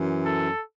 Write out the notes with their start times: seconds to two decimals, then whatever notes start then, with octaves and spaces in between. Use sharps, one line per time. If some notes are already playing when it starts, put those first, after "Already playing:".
Already playing: F#2 E3
0.26 A4